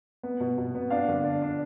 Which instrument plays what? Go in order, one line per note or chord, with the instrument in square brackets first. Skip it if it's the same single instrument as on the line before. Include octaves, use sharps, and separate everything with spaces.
[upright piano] B3
B2
B2
B3
D4 F5
D3
D4
D4